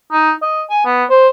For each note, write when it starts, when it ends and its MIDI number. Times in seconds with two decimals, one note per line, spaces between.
0.12 0.32 63
0.42 0.62 75
0.70 0.83 80
0.85 1.05 59
1.10 1.28 72